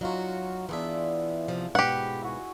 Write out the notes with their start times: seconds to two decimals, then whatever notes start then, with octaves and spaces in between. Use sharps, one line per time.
0.01 F#3 D#4 F4 F#4 C#5
0.69 E3 B3 D4 G#4 C5 E5
1.48 C3 F3
1.75 G#2 B2 G4 B4 F#5
2.22 E4 F#4 G#5